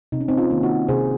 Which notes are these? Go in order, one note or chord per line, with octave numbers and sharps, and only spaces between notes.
C3 D#4
C#4
C4 D#4
C#4 F4
D#3 A#3
D#4 F#4
C3 G#4 C5